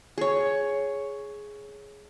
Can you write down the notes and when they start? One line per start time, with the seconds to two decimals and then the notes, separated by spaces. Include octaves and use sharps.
0.18 G#4 C#5